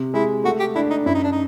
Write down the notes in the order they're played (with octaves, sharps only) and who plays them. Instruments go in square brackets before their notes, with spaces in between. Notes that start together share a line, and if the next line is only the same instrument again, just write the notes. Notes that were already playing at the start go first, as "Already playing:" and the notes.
Already playing: [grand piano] C3
[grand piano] G#3 [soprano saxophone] E4
[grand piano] A3 [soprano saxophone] F#4
[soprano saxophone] G4
[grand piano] D4 [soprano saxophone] E4
[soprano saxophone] D#4
[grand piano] F#2 [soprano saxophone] E4
[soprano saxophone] D#4
D4
D#4